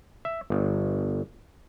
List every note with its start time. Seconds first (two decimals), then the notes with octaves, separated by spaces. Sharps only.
0.25 E5
0.50 G1